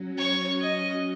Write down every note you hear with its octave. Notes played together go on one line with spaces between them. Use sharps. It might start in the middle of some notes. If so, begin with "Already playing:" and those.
Already playing: F#3 C#4 F#4
C#5
D#5